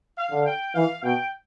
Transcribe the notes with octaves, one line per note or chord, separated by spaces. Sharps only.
F5
D3
G5
E3 F5
B2 G5